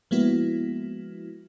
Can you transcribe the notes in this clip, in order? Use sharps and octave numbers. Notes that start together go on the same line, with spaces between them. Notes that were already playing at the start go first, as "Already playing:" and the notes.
F3 G#3 A#3 B3 E4 F#4